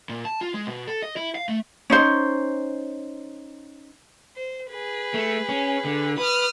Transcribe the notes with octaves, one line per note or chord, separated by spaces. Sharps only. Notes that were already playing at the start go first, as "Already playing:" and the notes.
A#2
A5
F4
G#3
B2
A4
D#5
E4
F5
A3
C#4 D#4 C5
C5
G#4 B4
A3
C#4
D3
B4 D#6 F6